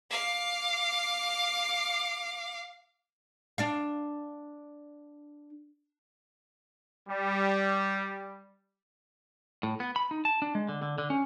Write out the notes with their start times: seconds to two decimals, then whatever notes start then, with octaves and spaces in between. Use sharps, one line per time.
0.10 F5 D6
3.58 D4 D5 F5
7.08 G3
9.63 A2
9.80 B3
9.96 B5
10.11 D#4
10.25 A5
10.42 D4
10.55 G#3
10.69 D3
10.82 D3
10.98 D3
11.10 C#4